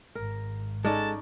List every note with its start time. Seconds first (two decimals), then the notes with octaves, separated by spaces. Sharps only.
0.15 G#1 A#4
0.85 G#3 C#4 D#4 A4 D5 A5